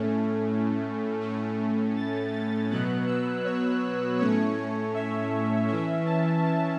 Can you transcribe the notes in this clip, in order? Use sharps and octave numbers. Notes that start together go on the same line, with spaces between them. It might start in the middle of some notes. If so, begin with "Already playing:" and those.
Already playing: A2 A3 C#4
A2 A3 C#4
A6
A6
B2 F#3 B3 F#6
E6
C#5
A2 A3 C#4 C#5
C#5
E5
E3 C#4 E5
A5
A5